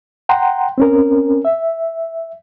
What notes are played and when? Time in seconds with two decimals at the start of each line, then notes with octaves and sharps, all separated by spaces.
0.29 F#5 G5 A#5 C6
0.78 C4 C#4 A#4
1.45 E5